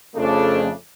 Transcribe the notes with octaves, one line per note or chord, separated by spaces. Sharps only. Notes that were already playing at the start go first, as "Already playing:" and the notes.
F2 C#3 A3 D4